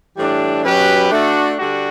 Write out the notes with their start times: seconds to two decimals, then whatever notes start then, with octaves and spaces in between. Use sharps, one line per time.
0.17 A2 E3 G3 D4
0.63 B2 F#3 C#4 G4 B4
1.09 A3 D4 F#4
1.55 D3 G3 D4 F#4